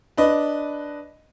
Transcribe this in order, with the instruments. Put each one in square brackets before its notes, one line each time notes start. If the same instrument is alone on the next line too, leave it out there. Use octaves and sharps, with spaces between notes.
[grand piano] D4 B4 D#5